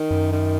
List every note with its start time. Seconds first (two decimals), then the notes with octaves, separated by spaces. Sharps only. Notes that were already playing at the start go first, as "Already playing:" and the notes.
Already playing: D#3
0.11 F#2
0.32 D#3